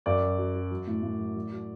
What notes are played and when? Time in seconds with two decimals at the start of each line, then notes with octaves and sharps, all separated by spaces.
0.06 F#2 D5
0.22 F#3
0.38 F#3
0.55 F#3
0.71 F#3
0.87 A2
1.03 A2
1.19 F#3
1.36 F#3
1.52 F#3